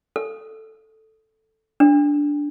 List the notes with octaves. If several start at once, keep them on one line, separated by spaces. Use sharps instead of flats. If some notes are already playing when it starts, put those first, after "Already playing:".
A4
D4